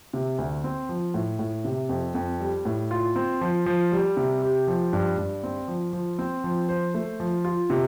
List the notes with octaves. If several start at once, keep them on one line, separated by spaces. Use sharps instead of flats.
C3
D2
C4
F3
A2
A2
C3
F2
F2
G3
A2
F4
C4
F3
F3
G3
C3
G4
F3
G2
G2
C4
F3
F3
C4
F3
C5
A3
F3
F4
C3